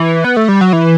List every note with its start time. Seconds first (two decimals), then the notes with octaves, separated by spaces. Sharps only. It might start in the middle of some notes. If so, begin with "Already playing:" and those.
Already playing: E3
0.24 B3
0.37 A3
0.48 G3
0.61 F#3
0.73 E3